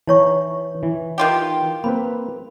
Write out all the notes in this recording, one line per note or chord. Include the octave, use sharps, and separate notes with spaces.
E3 D#4 C#5 A#5 C#6
E3
D#3 F4 G4
A#3 C4 B4 B5